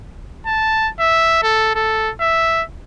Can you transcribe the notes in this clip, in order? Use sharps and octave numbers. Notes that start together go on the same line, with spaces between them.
A5
E5
A4
A4
E5